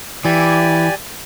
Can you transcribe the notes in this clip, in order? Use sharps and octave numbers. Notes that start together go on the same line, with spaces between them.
E3 G4 D5 G#5